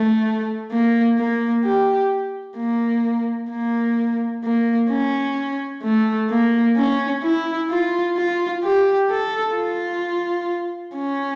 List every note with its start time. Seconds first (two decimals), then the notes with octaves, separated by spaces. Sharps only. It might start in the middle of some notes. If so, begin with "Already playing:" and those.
Already playing: A3
0.71 A#3
1.18 A#3
1.65 G4
2.57 A#3
3.50 A#3
4.44 A#3
4.90 C#4
5.84 A3
6.30 A#3
6.76 C#4
7.23 E4
7.70 F4
8.17 F4
8.64 G4
9.10 A4
9.56 F4
10.96 C#4